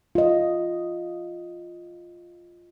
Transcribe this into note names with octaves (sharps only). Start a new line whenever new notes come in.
F4 D#5